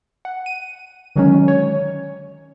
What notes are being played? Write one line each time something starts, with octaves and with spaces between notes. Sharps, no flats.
F#5
D#7
D3 D#3 F#3 G#3 C#4
C#5